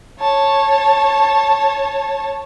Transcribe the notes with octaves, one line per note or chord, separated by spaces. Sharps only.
C#5 A5